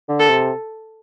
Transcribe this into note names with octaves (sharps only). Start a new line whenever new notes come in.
D3
A4
C3